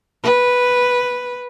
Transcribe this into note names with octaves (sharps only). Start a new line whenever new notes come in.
B4